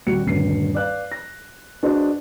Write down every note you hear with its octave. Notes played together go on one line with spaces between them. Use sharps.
D#1 G3 F#4 C#7
D#1 D2 G2 C7
B4 D5 F5 F#6
A#6
D4 F#4 G#4 B4 C5 D#5